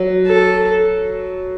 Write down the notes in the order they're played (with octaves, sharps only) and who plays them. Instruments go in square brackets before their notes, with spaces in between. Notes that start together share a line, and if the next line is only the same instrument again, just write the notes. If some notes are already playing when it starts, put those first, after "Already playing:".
Already playing: [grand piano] F#3
[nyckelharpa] A4